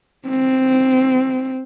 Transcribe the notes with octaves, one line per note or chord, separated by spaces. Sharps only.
C4